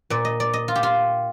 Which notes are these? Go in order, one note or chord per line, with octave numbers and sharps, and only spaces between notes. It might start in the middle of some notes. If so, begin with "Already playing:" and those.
A#2 D5
D#5
D5
D#5
F4
G4
F4